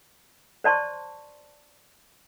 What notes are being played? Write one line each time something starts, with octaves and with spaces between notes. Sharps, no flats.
C5 D5 A5 C6 C#6